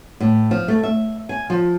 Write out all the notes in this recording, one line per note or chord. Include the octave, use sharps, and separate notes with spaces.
A2
F3
A3
E5
G#5
F3